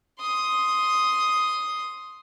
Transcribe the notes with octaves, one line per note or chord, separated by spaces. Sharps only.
C6 D#6